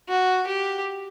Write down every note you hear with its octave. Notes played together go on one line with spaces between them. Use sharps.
F#4
G4